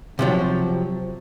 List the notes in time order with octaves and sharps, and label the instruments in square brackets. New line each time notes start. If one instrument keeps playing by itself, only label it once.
[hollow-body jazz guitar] C3 F3 F#3